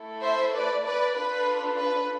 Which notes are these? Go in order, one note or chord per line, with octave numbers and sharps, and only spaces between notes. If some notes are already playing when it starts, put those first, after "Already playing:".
Already playing: A3 E4 A4
C5 E5
B4 D5
B4 D5
D4 F4 A4 B4
B4